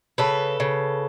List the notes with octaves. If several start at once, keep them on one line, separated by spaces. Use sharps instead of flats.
C#3 A4 B4
C#3